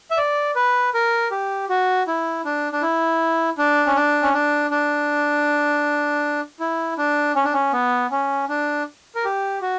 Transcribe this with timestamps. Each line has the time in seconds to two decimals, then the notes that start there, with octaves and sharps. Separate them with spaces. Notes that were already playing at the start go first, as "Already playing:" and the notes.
0.11 E5
0.17 D5
0.56 B4
0.94 A#4
1.31 G4
1.69 F#4
2.07 E4
2.45 D4
2.72 D4
2.82 E4
3.58 D4
3.87 C#4
3.96 D4
4.22 C#4
4.33 D4
4.71 D4
6.60 E4
6.98 D4
7.36 C#4
7.44 D4
7.53 C#4
7.73 B3
8.11 C#4
8.49 D4
9.15 A#4
9.25 G4
9.62 F#4